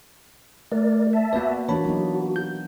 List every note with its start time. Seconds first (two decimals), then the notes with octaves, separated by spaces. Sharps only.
0.72 A3 A#4 D5
1.13 E5 A5
1.33 A#3 B3 F#4 B4 D5
1.69 E3 A#3 D4 F#4 C#5 A5 B5
1.85 F#3 B3 D#4
2.36 G6